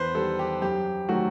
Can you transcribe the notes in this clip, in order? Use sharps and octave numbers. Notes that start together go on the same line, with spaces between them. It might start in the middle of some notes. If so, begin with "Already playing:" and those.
Already playing: E2 B4 C5
D#3 G3 A4
G4
F#2 G4
D#3 F#3 A3 F#4